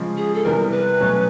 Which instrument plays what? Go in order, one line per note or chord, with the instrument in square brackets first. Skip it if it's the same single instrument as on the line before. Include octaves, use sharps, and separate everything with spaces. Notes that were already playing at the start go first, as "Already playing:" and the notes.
Already playing: [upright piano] C#3 F3 G#3
[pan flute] G#4
A4
[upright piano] C3 E3 G3 B3 [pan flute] A#4
[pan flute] B4
[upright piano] B2 F#3 A3 C#4